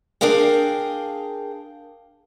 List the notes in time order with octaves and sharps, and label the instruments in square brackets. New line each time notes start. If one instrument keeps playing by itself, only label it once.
[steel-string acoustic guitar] D4 G#4 A#4 F5 G5